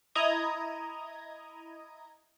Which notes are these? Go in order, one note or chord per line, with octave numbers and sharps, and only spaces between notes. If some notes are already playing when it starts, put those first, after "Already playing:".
E4 D#5 A#5 D#6 G#6